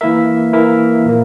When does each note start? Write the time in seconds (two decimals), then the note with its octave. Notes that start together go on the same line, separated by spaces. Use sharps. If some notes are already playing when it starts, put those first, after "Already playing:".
0.01 E3 A#3 E4 A#4 E5
0.53 E3 A#3 E4 A#4 E5
1.06 A#2 F3 A#3